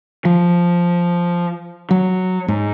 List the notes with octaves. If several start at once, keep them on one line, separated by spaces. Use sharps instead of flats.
F3
F#3
G#2